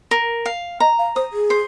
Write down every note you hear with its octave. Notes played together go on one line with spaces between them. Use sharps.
A#4
F5
D#5 A#5
F5
C5 D#6
G#4
C5